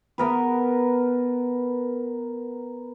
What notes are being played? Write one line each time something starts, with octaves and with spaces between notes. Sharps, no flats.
B3 A#4 B4